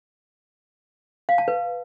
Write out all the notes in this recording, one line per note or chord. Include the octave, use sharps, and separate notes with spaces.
F5
A5
B4